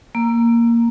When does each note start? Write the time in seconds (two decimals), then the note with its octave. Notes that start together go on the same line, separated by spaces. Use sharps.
0.15 A#3